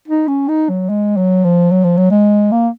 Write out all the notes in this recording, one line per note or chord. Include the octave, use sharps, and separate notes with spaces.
D#4
C#4
D#4
F#3
G#3
F#3
F3
F#3
F3
F#3
G#3
A#3